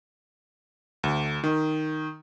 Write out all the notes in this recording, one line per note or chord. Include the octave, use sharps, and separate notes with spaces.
D2
D#3